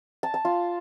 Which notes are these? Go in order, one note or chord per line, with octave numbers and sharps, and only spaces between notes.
A5
A5
F4